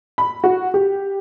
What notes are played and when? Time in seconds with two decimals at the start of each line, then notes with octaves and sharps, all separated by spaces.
0.18 B5
0.44 F#4
0.74 G4